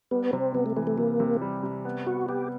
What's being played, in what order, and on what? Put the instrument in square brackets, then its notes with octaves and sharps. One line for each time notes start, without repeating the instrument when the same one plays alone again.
[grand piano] G3 [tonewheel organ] B3
[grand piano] C3 [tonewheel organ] C4
[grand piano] C3 [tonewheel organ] B3
[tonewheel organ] A3
[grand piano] E3 [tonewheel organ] A3
[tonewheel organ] A3
[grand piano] C3 [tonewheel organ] A#3
[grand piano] C3
G3
C3
B3
[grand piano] B3 [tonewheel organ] F#4
[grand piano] B3 [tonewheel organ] G4